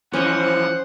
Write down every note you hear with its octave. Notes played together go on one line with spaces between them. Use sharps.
E3 F3 C#4 C5 D#5 F#5